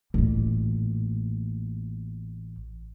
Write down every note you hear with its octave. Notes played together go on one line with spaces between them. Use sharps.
A1 A#2